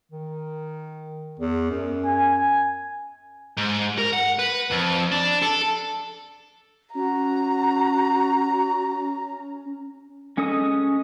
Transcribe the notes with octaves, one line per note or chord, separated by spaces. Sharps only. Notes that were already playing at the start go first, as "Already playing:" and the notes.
D#3
E2
F#2
G#5
G#2
A#4
F#5
B4
F2
D4
A4
C#4 F#4 A#5
G#3 C#4 A4 D#5 D#6